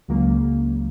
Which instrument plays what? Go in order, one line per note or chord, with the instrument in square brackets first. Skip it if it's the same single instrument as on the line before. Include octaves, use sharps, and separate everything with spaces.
[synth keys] C#2 C#3 F#3 A#3